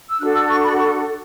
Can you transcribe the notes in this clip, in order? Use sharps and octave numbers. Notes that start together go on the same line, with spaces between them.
E6
D4 F#4 A4 F#6
E6
C#6
B5
C#6